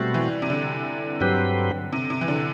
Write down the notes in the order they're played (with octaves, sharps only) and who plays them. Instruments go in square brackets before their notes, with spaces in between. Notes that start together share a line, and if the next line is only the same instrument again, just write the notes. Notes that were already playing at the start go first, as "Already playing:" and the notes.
Already playing: [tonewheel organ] B2 A3 C4 F#4 [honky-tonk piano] G3
[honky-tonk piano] E3
C3
D3
[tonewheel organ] G2 F#3 C4 G4 B4
[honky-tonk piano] C3
C3
E3
D3